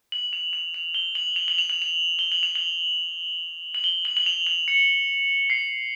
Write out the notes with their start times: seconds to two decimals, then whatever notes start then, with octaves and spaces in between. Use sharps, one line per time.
0.12 F#7
0.33 F7
0.53 F7
0.74 F7
0.94 G7
1.15 F#7
1.36 F7
1.48 F#7
1.58 F7
1.70 F#7
1.82 F7
2.19 G7
2.32 F#7
2.43 F7
2.55 F#7
3.75 F#7
3.84 G7
4.05 F#7
4.17 F#7
4.26 F7
4.47 F#7
4.68 C#7
5.50 C7